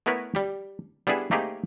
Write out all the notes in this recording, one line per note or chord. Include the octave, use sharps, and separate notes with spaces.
A3 B3 E4 A#4 B4 C#5
G3 G4
G3 B3 D4 E4 G#4 A4
A3 A#3 C4 D#4 G4 G#4